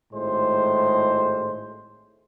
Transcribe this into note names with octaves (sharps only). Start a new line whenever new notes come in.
G#1 A2 G#3 C5